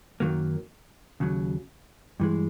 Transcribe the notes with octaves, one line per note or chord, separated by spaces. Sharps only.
F#2 D#3 F#3 A#3
D#2 C#3 F#3
G2 E3 G#3